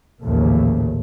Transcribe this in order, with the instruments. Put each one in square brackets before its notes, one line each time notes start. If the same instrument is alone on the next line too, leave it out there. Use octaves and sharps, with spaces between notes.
[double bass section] A1 D#2 A#2 C#3 F3 A3